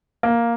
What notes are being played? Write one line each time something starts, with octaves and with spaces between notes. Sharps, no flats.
A#3